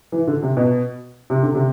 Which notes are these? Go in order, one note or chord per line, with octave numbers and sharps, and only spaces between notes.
E3
D3
C3
B2
C3
D3
C3